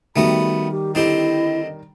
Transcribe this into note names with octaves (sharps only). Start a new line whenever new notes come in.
D#3 G3 A3 B3 F#4 B5
G4
D3 C4 E4 G4 D#5